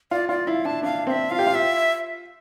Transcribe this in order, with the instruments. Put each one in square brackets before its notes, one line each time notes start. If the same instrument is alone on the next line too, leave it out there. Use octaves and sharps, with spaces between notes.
[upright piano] F4 [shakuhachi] D5
[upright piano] F4 [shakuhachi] D5
[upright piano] E4 [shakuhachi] F5
[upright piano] D4 [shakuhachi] A5
[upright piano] D4 [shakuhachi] F5
[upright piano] C4 [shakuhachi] E5 F5
[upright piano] F4 [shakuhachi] F5
[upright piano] G4
F4
[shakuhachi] E5